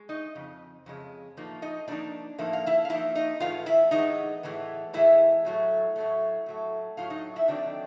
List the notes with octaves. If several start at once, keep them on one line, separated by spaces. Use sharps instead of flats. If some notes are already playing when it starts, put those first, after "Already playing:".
Already playing: G#3
D#4 D#5
F2 C#3
F2 C#3 G#3
A2 F3 A#3 D#4
D#4 D#5
A2 F3 A#3 D4 D#4 D5
A2 F3 A#3 D#4 E5
F5
E4 E5
F5
A2 F3 A#3 D#4 E4 E5
D#4 D#5
A2 E3 G#3 B3 F4 F5
E4 E5
A2 E3 G#3 B3 D#4 D#5
A2 E3 G#3 B3
A2 E3 G#3 B3 E4 E5
A2 F#3 A3
A2 F#3 A3
A2 F#3 A3
A2 F#3 A3 F4 F5
D#4 D#5
E4 E5
D#3 F#3 A3 C4 D4 D#4 D5